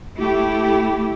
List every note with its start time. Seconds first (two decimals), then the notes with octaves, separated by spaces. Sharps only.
0.18 A3 E4 G4